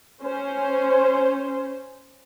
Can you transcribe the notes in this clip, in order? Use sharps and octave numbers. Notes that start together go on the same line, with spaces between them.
C#4 C5